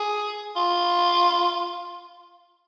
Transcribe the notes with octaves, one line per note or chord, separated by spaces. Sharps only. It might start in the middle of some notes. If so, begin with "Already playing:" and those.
Already playing: G#4
F4